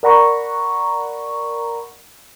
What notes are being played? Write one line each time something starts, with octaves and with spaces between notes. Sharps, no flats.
A#4 D5 F#5 A#5 B5 C#6